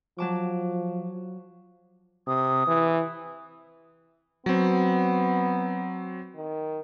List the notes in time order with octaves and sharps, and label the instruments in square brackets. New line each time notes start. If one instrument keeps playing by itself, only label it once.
[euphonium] F3 [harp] F#3 A5 D6
[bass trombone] C3 [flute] D#6
[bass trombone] E3
[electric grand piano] F#3 C4 [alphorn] B3
[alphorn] D#3